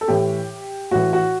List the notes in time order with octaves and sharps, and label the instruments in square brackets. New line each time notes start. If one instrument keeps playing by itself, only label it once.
[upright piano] A4
A2 E3 G4
A2 E3 F#4
F#4